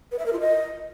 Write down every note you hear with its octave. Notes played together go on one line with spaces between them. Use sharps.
B4
E5
A#4
F4
D#5